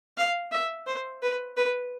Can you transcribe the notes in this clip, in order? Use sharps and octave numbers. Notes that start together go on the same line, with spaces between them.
F5
E5
C5
B4
B4